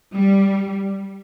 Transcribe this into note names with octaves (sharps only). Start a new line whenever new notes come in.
G3